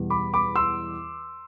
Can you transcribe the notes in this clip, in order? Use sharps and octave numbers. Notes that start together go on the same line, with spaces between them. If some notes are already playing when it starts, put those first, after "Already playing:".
Already playing: E2 B2 G3
B5 D6
B5 D6
C6 E6